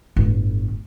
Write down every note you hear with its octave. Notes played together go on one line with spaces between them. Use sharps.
G1 A2